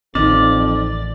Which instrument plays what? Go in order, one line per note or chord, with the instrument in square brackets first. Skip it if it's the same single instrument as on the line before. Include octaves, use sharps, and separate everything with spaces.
[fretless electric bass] A1 [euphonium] F2 [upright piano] D#3 [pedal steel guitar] D5